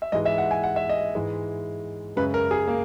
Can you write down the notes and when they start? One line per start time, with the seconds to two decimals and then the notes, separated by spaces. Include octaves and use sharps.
0.02 E5
0.12 G#2 E3 G#3 D#5
0.25 E5
0.38 F#5
0.51 G#5
0.64 F#5
0.76 E5
0.89 D#5
1.15 G#2 E3 G#3
2.16 F#2 C#3 G#3 B4
2.34 A#4
2.51 G#4
2.68 A#3